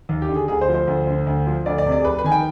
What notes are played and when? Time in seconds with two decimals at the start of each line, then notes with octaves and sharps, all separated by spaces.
0.09 D#2
0.22 G4
0.29 D3
0.35 G#4
0.48 D2 G#4
0.61 C5
0.68 F3
0.74 C5
0.87 D2
1.07 D3
1.27 D2
1.47 F3
1.66 D2 D5
1.78 D5
1.86 C3
1.92 D5
2.00 G#4
2.05 F1 B4
2.19 B4
2.24 D#3 G#5
2.32 G5